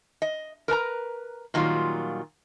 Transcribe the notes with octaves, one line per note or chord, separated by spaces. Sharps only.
D#5
A#4 B4 A5 A#5
A#2 D#3 F#3 G3 F4